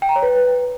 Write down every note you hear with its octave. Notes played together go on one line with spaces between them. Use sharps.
G5
A#5
C#5
B4